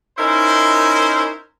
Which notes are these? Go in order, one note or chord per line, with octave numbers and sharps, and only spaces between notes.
C#4 D#4 E4 A#4 C5